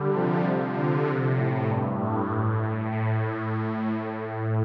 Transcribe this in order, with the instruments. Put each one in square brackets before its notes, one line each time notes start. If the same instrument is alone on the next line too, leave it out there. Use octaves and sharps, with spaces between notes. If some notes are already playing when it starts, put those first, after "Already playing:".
Already playing: [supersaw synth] D3 G3
C3 F3
D3
C3
A2
G2
A2
A2